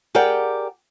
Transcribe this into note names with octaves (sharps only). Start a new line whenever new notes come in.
G4 G#4 A#4 D5 F#5 G5